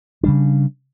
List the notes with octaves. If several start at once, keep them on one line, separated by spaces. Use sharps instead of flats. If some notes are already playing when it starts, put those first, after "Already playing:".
C#3 G3 D4